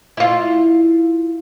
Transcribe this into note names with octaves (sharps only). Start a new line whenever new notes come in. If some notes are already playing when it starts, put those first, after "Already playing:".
E4 F4